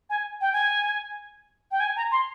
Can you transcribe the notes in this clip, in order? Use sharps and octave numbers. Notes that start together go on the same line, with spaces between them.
G#5
G5
G#5
G5
G#5
A#5
C6